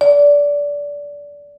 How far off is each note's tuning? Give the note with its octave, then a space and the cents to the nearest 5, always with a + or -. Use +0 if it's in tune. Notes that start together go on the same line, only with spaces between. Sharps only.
D5 -20